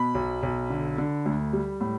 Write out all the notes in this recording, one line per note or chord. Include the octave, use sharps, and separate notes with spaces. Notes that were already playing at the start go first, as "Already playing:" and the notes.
Already playing: B2 B5
B1
B1
D3
D3
D2
G3
A2